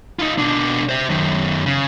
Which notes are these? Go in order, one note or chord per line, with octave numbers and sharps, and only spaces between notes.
D#4 F4
B2 D4
C5 E5
F#2 D#3
C#3